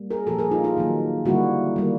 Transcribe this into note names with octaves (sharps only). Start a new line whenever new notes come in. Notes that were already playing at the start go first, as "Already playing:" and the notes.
Already playing: G3 A#3
G#4 A#4
A#2 F3 A#3 G4 A4
G#4 A#4
D#4 F4
D#4 F4
D#3 F#3 A#3
D3 G3 A#3 E4 F#4
D#3 G3 A#3